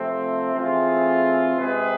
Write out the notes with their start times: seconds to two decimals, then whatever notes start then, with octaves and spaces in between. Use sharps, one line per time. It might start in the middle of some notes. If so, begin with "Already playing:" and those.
Already playing: C3 F3 A3 C4
0.54 E3 A3 C4 F4 G#4
1.56 C3 G#3 C4 G#4 B4